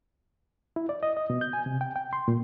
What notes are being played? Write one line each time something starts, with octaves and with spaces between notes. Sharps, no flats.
E4
D5
D#5
D#5
B2
G6
G#5
C3
G5
G5
C6
A#2